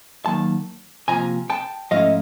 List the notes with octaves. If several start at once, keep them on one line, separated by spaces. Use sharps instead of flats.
D#3 F#3 A#3 A5
C3 F3 A#3 G#5 A#5
G5 A5
G#2 F3 A3 C#4 E4 D#5 F5